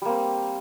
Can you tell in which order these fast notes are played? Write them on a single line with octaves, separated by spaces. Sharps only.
G3 A#3 C4